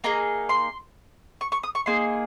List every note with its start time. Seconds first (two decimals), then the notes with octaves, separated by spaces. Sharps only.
0.04 A#3 D#4 G#4 A#5
0.49 C6
1.41 C#6
1.52 C#6
1.63 D#6
1.75 C#6
1.86 A#3 D#4 G#4 C6